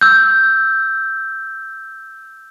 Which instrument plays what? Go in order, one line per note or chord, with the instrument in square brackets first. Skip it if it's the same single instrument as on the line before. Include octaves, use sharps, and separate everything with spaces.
[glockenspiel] E6 G6